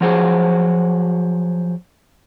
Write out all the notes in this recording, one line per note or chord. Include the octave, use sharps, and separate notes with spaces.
F3 F#3 F#4 G#4 C5